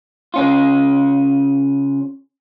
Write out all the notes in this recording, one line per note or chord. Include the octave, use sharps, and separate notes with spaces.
C#3 C#4 F4